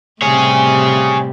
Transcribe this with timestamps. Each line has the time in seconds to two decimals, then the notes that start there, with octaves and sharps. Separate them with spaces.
0.22 A2 C3 G3 G#4 C#5